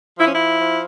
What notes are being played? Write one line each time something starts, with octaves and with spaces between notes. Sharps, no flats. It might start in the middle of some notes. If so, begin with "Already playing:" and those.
F3 E4
C#4
E4
F3